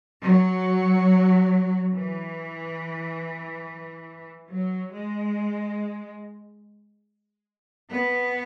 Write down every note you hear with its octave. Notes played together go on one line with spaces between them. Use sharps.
F#3
E3
F#3
G#3
B3